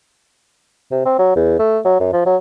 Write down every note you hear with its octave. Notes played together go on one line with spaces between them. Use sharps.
C3
C4
F#3
E2
A3
F#3
F#2
F3
F#3